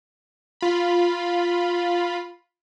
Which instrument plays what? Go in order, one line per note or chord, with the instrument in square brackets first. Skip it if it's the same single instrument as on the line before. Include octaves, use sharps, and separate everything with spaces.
[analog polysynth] F4 B5